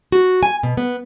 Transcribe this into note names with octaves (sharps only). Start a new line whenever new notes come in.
F#4
G#5
B2
B3